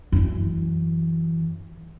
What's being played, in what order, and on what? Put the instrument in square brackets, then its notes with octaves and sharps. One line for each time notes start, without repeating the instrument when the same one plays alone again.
[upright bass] F#2 E3